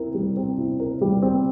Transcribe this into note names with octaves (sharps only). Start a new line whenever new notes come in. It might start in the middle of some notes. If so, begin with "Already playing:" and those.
Already playing: C4 E4 A#4
G3
C4
E4
A#4
G3
C4